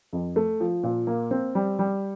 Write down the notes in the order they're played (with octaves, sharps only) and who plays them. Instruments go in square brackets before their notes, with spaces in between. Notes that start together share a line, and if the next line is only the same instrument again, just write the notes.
[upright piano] F2
A3
F3
A#2
A#3
C4
G3
G3